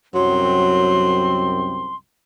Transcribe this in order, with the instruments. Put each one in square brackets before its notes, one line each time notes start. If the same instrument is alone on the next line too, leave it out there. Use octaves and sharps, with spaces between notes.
[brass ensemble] C2 F#2 C4 [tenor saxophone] F#3 [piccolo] C6